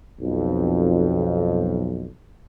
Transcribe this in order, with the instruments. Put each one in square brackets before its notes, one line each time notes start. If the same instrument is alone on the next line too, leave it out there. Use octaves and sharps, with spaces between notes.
[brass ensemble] B1 F2